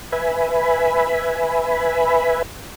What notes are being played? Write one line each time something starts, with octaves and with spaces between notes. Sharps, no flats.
B4 E5 G#5 B5